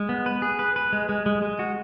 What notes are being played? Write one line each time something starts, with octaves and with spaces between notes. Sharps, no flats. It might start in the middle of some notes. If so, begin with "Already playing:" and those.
Already playing: G#3
B3
B4
G#4
B4
B4
G#3
G#3
G#3
G#3
F#4